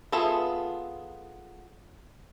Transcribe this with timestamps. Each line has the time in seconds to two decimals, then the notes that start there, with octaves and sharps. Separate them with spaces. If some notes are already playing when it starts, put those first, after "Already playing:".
0.12 B3 F4 G#4 A4 E5